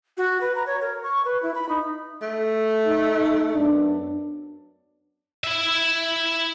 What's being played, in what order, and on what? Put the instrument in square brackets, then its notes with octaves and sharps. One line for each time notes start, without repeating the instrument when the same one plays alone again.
[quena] F#4
B4
A#5
C#5
A#4
C#6
B4
E4
B5
D#4
[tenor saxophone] A3
[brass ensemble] D#4
F#2 B3 D4
[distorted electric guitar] E4 E5